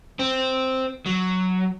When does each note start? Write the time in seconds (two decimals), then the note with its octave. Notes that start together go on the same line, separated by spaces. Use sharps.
0.19 C4
1.06 F#3